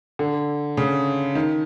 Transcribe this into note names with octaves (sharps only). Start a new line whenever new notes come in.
D3
C#3
D#3